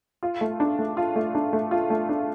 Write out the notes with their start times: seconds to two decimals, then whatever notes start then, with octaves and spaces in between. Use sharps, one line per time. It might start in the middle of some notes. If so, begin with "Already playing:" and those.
0.23 F4
0.41 A3
0.60 D4
0.79 A3
0.97 F4
1.16 A3
1.35 D4
1.53 A3
1.71 F4
1.90 A3
2.09 D4